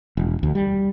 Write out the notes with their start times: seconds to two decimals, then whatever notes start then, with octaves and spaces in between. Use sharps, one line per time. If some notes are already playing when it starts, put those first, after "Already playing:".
0.17 E1
0.43 D2
0.55 G3